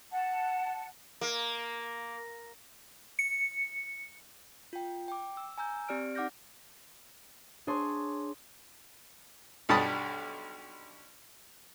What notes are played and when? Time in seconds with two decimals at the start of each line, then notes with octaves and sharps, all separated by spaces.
0.12 F#5 A5
1.21 A#3
3.19 C#7
4.73 F4 G5
5.08 G5 D6
5.37 E6
5.58 G#5 A#5 E6 G6
5.88 C4 G4 D5 F6 D7
6.15 D#4 F#5 D6 F6 G6 A#6
7.67 D4 G#4 C#5 C6
9.69 B1 G2 A5 B5 D#6